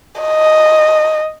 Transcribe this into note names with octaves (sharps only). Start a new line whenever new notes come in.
D#5